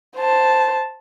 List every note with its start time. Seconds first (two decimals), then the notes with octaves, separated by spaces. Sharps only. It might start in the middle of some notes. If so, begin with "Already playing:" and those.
0.17 C5 A5